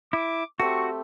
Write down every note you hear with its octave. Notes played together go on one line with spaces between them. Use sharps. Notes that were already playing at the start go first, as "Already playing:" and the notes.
E4 D6
A3 C4 F#4 G4 C#6